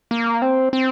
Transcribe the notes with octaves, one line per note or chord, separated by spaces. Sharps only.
A#3
C4
C4